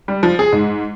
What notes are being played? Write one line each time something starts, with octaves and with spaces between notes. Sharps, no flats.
G3
F3
G#4
G#2